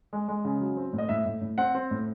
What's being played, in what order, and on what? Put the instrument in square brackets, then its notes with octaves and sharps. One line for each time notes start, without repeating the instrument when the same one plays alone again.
[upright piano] G#3
G#3
C#3
F#3
C4
A2
D#5
A2 E5
A2
A2
C4 F#5
C4
A2